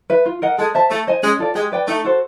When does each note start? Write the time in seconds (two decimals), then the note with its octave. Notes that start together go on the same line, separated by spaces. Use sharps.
0.10 B4 E5
0.26 F4
0.42 A#4 D#5 F#5
0.58 G#3 A4
0.74 C5 E5 A5
0.91 A3 A4
1.07 C5 D#5 G#5
1.23 G#3 C#4
1.39 F4 A4 D5
1.55 G#3 G4
1.72 B4 D5 G5
1.88 A3 D#4
2.05 F#4 A4 C5